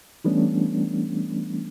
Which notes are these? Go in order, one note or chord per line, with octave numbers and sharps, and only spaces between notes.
E3 G3 A3 B3 C#4 D4